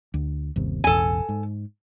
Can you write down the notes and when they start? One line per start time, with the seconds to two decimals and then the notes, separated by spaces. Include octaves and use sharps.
0.14 D2
0.56 G1 D#2 C3
0.84 E1 A1 E2 A4 G#5
1.29 G#2